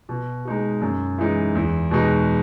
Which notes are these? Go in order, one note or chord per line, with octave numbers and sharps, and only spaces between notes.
B2
G#3 D#4 F#4
F#2
E3 G#3 D#4
E2
B2 G#3 D#4 F#4